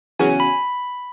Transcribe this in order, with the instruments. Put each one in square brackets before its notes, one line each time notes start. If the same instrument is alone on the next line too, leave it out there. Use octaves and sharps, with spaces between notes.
[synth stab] E2 C#3 F#3 C#4 F#4 [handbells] G#5
[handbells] B5